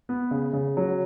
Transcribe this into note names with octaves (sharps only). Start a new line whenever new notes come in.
B3
C#3
C#3
F#3